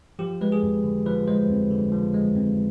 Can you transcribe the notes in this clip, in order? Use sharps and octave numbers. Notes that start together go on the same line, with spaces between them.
F3 G4
G#3 B4
G#4
F2
D3
F3 B4
G#3 C5
F2
D3
F3
G#3
F2